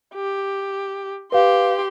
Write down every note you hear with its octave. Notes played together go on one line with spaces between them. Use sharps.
G4
G4 B4 F5 C6